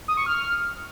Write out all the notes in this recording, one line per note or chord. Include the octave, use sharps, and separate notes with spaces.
D#6
C#6
F6